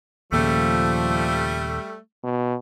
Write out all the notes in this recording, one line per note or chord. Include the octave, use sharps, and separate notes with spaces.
D#2 A#2 C#3 F3 G3 A3
B2